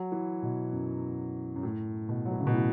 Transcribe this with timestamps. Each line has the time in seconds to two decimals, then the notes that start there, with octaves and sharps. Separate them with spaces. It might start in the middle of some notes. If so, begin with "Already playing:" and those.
Already playing: F#3
0.12 E3
0.43 B2
0.73 F#2
1.56 F#2
1.63 A2
2.09 B2
2.26 F#3
2.32 E3
2.40 C#3
2.47 B2
2.54 A2